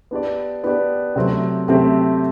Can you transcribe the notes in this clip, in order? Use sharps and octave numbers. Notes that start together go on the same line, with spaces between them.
B3 D4 G4 D5
B3 D4 G4 D5
C3 F#3 A3 C4 G4
C3 F#3 A3 C4 G4